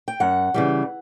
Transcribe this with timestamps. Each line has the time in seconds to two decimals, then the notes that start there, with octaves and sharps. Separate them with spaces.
0.08 G5
0.20 F#2 F#5
0.54 C#3 E3 G3